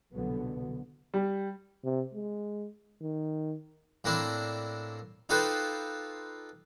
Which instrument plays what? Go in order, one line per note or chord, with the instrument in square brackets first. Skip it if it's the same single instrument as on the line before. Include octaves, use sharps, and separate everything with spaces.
[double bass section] C2 B2 D3 F#3 B3
[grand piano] G3
[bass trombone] C3
G#3
D#3
[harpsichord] A2 A#3 C4 D4 E4
D#4 F4 G4 A4 B4 C5